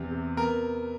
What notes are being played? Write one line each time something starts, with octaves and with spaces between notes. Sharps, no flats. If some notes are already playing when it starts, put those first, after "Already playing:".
Already playing: E2 C3
C3
B3 A#4